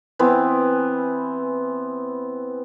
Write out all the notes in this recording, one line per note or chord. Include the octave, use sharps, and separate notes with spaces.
E3 B3 C4